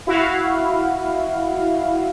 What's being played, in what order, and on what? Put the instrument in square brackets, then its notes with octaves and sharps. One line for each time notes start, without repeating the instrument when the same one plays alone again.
[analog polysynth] E4 F#4 F5